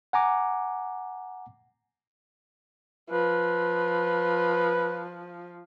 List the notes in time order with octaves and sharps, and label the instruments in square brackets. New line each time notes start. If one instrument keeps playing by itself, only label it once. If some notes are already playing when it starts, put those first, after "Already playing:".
[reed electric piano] F#5 G#5 A#5 D6
[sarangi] F3 [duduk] B4